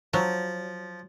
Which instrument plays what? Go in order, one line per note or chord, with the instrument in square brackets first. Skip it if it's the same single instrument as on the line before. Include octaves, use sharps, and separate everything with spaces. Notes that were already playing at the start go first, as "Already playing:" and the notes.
[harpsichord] F3 [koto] F#3